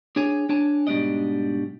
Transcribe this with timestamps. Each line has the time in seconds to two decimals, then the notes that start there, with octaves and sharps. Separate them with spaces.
0.16 D4 G#4 C#5 G#5
0.49 D4 C#5 G#5 A5
0.87 G#2 B2 G3 D4 D5 D#5